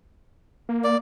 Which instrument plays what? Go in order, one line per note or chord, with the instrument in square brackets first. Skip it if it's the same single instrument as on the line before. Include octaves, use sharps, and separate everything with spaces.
[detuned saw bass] A#3
[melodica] D5